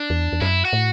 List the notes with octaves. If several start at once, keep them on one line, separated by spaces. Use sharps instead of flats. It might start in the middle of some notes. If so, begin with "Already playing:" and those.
Already playing: D4
E2
E2
F#2 E4
F#4
A2